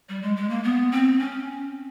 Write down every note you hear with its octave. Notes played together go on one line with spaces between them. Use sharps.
G3
G#3
G#3
A#3
B3
C4
C#4